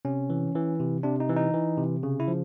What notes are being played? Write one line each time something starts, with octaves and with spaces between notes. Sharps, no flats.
C3 C#4
E3
E3
C3
C3 D4
D#4
E3
D#4
E3
C3
C#3
E4
F3